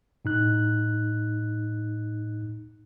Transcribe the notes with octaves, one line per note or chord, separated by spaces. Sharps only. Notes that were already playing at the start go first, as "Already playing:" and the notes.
A2 D#4 F#6